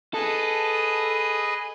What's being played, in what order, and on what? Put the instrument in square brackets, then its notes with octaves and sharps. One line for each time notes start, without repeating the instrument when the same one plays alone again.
[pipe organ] G#4 B4 D#5 [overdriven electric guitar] A4